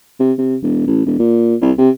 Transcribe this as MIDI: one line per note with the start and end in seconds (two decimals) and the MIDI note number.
0.20 0.33 48
0.38 0.56 48
0.63 0.87 28
0.87 1.02 33
1.06 1.15 28
1.19 1.55 46
1.62 1.72 36
1.78 1.90 48